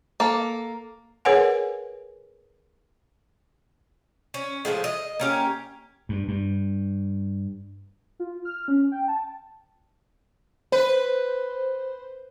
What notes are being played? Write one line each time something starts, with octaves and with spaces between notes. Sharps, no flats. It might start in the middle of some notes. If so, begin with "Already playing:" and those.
A#3 A4
G#4 A#4 B4 C#5 F#5 G#5
C#4
A2 D3 F3 G#3
D#5
A#3 C#4 G4
G2
G2
F4
F6
C#4
G5
A5
B4 C5